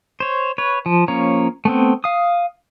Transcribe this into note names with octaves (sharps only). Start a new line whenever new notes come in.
C5 C#5
B4 C#5
F3
F3 A#3 C#4 C#5 A#5
A3 B3 C4
F5 D#6